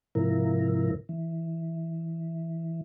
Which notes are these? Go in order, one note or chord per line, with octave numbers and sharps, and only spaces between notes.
G#2 C3 F3 E4 A#4
E3